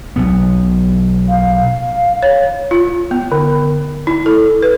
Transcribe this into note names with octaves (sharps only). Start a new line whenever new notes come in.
B1 B2 B3
F5
C#5
F4
B3
D3
E4
A4
B4